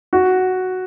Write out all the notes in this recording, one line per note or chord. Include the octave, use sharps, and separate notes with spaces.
F#4